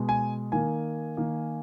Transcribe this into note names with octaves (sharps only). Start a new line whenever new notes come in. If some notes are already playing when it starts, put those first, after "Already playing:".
Already playing: B2 G#3
G#5
D#3 A#3 G#5
D#3 A#3